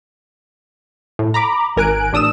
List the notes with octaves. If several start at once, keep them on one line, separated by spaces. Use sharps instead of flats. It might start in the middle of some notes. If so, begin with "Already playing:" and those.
A2
A#5 B5 D6
G#1 A#4 G#5 F#6 D7
A1 D4 D#6 E6 E7